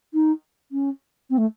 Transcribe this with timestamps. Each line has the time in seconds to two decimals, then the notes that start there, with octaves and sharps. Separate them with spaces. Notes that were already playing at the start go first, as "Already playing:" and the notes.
0.14 D#4
0.72 C#4
1.30 C4
1.37 A3